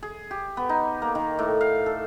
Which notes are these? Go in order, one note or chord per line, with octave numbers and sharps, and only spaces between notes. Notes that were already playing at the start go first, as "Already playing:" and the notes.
G#4
G4
B3
D#4
A#3
D#3
A2
F5
A4